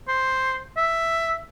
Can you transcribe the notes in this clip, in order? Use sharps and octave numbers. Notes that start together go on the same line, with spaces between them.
C5
E5